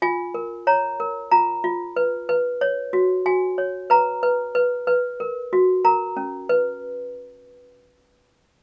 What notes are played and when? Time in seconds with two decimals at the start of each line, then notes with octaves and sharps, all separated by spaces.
0.02 F4 G#5
0.34 A#4
0.67 C#5 A#5
1.00 A#4
1.31 F4 A#5
1.64 F4
1.96 B4
2.29 B4
2.61 C#5
2.93 F#4
3.26 F#4 G#5
3.58 C#5
3.90 B4 A#5
4.23 B4
4.55 B4
4.87 B4
5.20 A#4
5.53 F#4
5.85 A#4 A#5
6.17 C#4
6.49 B4